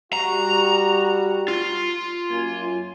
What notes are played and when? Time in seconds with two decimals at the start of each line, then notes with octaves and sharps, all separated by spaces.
0.13 G3 F#4 A#5
1.48 F4
2.30 F#2 A#3 G#5